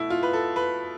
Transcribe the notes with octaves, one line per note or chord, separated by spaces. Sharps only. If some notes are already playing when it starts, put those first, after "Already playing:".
Already playing: B2 A3 E4
F4
B4
A4
B4